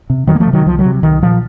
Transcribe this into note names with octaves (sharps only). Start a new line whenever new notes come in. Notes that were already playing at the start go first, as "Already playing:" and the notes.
C3
F2 D#3 F#3
A#3
F3 A3
C3
D#3 F#3
C2 F3
D#3 F#3
C3
C2 D#3
A#2 F3